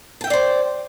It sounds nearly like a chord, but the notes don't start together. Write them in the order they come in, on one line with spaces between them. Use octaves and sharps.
A5 G5 E5 D5 C5